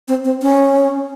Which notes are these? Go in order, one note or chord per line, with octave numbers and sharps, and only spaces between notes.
C4
C4
C#4